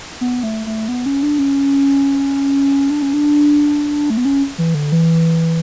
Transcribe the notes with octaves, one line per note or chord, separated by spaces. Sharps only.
B3
A3
A3
B3
C#4
D4
C#4
D4
C#4
D4
A3
B3
C#4
E3
D3
E3